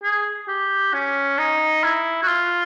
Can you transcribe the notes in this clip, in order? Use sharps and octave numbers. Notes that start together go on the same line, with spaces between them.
G#4
G4
C#4
D#4
E4
F#4
F4